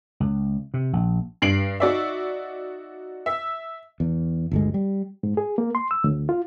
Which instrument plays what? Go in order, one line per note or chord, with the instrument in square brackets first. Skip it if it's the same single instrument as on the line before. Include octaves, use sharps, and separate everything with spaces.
[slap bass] C#2
C3
A#1
[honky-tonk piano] G2 C7 D7 F#7
D#4 F#4 D5 E5
E5
[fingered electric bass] E2
G1 D2 G#3
G3
[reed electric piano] G#2
G#4
A#3
C6
E6
D2
F4